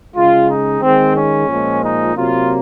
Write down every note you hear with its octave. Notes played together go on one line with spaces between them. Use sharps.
C#3 G#3 F4
D#4
D#3 G#3 C4
C#4
A#2 F3 G#3
D#4
C3 F#3 A#3 F4